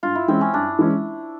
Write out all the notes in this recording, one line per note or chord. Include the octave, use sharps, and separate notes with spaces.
G2 F4
E4
E3 G#3 C4 C#4
C#4
G2 D4
E3 G#3 C#4